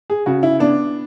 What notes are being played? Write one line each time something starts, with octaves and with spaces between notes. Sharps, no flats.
G#4
C#3 F#4
E4
B3 D4